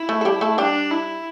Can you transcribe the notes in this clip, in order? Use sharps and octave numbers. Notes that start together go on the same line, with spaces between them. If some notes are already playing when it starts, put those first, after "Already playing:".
Already playing: E4
A3 A4
A4
G3 G4
A3 A4
G3 D4 G4
E4